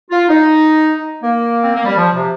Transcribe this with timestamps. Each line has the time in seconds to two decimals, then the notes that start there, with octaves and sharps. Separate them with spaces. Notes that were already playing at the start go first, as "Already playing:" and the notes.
0.11 F4
0.29 D#4
1.22 A#3
1.64 C4
1.75 A#3
1.85 G3
1.96 F3
2.15 C3